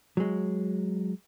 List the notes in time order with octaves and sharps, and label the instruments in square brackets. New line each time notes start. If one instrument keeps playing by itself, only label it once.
[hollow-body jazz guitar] F#3 G#3